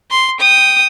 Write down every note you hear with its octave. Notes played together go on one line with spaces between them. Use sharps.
C6
G5 D#6